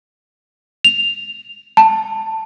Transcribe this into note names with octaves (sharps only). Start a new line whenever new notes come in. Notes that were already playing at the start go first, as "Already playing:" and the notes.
F7
A5